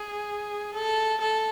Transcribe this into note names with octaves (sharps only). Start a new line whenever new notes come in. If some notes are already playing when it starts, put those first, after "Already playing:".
Already playing: G#4
A4
A4